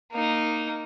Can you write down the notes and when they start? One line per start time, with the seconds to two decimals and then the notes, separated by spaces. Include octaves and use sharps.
0.12 A#3 D#4